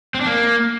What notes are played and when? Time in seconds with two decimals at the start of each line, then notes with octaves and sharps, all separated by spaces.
0.15 C4
0.21 D4
0.27 A#3